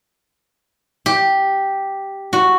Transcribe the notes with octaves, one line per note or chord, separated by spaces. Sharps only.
G4
F#4